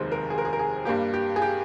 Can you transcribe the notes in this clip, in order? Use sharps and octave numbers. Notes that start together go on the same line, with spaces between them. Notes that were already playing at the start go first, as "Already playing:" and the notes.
Already playing: F1 D#2 D#3 G#3 C5
A#4
G#4
A#4
G#4
A#4
G#4
G2 G3 A#3 G4
G4
G#4
G4